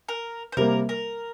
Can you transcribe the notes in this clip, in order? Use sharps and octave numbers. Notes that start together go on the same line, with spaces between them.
A#4
C5
C3 G3 A#3 A#4
A#4